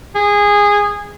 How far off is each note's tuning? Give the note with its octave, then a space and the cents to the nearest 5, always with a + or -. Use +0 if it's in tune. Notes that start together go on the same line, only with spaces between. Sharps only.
G#4 -20